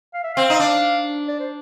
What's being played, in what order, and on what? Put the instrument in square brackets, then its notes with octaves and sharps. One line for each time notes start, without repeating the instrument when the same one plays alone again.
[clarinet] F5
E5
[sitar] C4 [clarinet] F5
[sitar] D#4
D4
[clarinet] D5
C5